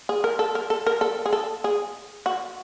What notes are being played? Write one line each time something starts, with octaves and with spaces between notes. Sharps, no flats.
G#4
A#4
A4
A#4
A4
A#4
A4
G#4
A4
G#4
F#4